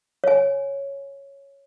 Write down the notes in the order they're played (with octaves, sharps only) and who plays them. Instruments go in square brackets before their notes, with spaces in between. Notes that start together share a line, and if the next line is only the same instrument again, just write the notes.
[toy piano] C#5 G#5